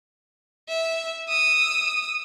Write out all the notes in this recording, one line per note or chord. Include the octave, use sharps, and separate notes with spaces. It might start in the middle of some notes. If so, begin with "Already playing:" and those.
E5
D#6 E6